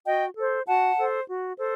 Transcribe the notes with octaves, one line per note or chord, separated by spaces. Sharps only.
F#4 D#5 G5
A4 C5
F#4 F#5 A5
A4 C5
F#4
A4 C5